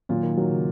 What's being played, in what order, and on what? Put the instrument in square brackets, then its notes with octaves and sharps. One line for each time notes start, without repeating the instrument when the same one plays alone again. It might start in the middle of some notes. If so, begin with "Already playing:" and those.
[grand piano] A#2 [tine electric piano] D#3 F#3
[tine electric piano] D#3
[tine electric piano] D#3 [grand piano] F#3
[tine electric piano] C#3